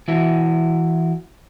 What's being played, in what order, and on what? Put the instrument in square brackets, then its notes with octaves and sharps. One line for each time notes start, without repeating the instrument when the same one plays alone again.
[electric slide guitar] E3 E4 F#4